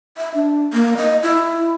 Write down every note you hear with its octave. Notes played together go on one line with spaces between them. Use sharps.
E5
D4
A#3
D#5
E4